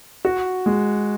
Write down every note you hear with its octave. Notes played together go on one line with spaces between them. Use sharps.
F#4
G#3